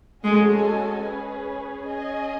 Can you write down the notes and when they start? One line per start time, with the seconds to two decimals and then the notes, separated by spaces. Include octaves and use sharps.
0.24 G#3 C#4 F#4 A4 D#5 G#5
1.04 C#4 G#4 B4
1.85 C#4 G#4 D#5 G#5